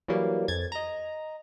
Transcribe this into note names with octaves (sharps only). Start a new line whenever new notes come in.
E3 F#3 G3 A#3
F2 G#6 A6
D#5 A#5